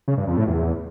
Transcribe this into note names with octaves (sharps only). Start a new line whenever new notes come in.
C#3
G2
F2
A2
E2